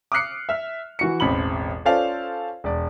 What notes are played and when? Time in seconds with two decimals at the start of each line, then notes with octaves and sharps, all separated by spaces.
0.12 D6 D#6 F6 F#6 C7 C#7
0.49 E5 F6
0.99 E3 F#4 C#7
1.20 E1 A1 C4 B5 F#7
1.85 C#4 F4 A4 C5 D5 F5
2.64 E1 D5